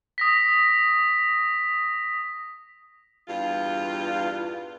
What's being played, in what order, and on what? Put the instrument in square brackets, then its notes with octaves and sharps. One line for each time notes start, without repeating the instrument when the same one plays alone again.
[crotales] D#6 A#6 B6
[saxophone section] E2 G2 F4